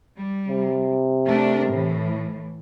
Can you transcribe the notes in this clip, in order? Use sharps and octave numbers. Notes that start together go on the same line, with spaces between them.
G3
C3
A3 D4 A#4
A2 E3